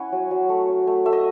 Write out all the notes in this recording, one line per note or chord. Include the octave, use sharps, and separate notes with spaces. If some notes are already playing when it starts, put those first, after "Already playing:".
Already playing: C#4 E4 F#5 G#5
F#3
F#3
A3
C#4
A3
A3 E5
D#5